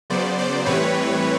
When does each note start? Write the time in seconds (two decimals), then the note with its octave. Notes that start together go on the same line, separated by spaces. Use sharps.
0.10 C#3 F#3 B3 C5 D5
0.38 C5 D5
0.66 A2 E3 G3 C4 B4 C#5